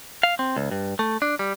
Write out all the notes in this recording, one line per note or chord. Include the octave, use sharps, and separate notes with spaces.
F5
C4
C#2
G2
A3
D4
G3